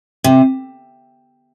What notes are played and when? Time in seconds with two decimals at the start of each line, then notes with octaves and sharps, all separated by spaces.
0.24 C3